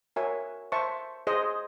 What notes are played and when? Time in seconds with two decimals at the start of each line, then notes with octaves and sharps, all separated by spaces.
0.16 F#4 A#4 C#5 E5 G#5
0.72 C5 E5 A5 C#6
1.27 G#4 C5 D#5